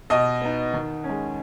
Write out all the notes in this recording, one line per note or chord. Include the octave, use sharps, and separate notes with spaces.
B2 D#5 D#6
B3 D#4
D#3
C#4
G#3